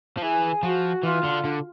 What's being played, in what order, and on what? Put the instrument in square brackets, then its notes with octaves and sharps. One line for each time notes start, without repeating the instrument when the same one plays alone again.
[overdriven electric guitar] F3
[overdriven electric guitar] E3 [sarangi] G#4
[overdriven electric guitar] F3 [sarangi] F#4
[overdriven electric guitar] E3 [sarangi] F4
[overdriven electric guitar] D3
D3